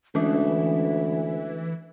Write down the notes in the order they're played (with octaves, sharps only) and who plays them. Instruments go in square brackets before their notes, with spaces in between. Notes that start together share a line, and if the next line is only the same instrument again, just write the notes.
[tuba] D2 [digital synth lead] E3 [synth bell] G#3 C#4 D4 [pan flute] E5